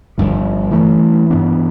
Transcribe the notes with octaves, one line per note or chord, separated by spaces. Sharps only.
G1 G2 F3
G2 E3 A3
G2 E3 B3 D4